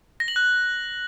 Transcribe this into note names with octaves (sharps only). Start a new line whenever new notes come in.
A#6
F#7
F#6